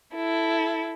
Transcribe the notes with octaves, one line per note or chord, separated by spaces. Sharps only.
E4 A4